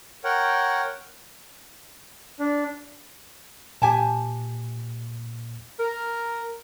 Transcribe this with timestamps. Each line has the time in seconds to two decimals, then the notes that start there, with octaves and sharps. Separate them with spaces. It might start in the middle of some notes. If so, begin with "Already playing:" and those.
0.24 A#4 C#5 F#5 G5
2.40 D4
3.82 A#2 G4 G#5 A5
5.80 A#4